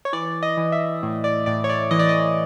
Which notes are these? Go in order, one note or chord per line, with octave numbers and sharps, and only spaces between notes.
C#5
E3 D5
D#5
E3
E5
A2
D5
A2 D5
C#5
D5
E3 D#5
D5
D#5